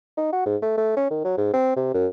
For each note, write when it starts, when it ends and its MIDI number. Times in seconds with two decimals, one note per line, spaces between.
0.17 0.28 63
0.32 0.45 66
0.46 0.56 44
0.62 0.75 57
0.77 0.96 57
0.97 1.08 61
1.11 1.21 51
1.24 1.37 54
1.37 1.51 44
1.53 1.74 60
1.76 1.91 48
1.94 2.07 42